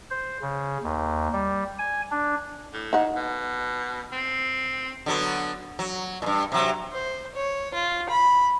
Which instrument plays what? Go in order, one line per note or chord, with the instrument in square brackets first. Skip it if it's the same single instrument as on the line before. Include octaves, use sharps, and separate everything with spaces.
[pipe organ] C5
C#3
D#2
G3
G#5
D4
[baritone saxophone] A2
[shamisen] D#4 F#5
[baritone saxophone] B2
C4
[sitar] D3 F#3 B3
F#3
G2 A#2
C3 F#3
[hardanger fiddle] C5
C#5
F4
B5